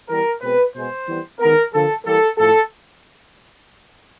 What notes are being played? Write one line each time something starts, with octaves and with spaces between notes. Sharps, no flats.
E3 G3 B3 A#4
B2 G#3 C4 B4
B2 G#3 B3 C5
E3 G3 B3
D#3 G#3 B3 A#4
D3 F3 A#3 A4
E3 G3 A#3 A4
A2 F3 A3 A4